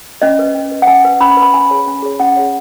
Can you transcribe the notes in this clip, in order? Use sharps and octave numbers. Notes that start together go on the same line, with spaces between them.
C#4 D#5
B4
C#4
B4
F#5
C#4 G#5
B4
C#4 B5
B5
B4
B5
C#4 G#5
G#4 C#5
C#4
G#4 C#5
C#4 F#5
G#4 C#5